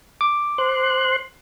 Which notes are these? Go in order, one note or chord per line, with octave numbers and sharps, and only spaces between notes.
D6
C5 C6 F#6